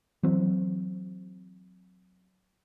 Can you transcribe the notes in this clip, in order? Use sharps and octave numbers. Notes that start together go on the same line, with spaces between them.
E3 F#3 C4